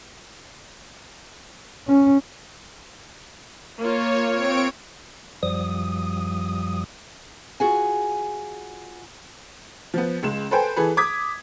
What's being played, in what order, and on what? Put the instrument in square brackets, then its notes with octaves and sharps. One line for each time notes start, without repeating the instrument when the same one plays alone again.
[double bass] C#4
[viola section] A#3 F4 [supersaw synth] C#5
[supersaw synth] C4 C#5 D7
[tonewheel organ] F#2 F3 G3 D#6
[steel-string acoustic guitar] F4 F#4 G#4 F#5 G#5
[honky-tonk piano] F3 B3
C#2 G#3 E7
A4 B4 C5 G5 G#5
E3 G#4 A4 B4
D6 D#6 G#6 B6